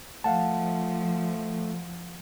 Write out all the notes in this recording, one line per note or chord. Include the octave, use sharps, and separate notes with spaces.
F3 A3 F5 F#5 A5